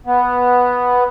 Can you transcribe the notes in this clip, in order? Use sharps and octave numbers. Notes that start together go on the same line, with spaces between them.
B3